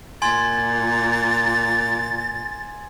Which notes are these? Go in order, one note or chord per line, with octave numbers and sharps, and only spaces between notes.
A#2 G#5 C6 G#6 A6